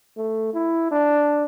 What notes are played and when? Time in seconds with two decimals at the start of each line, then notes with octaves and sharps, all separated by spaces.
0.17 A3
0.54 E4
0.91 D4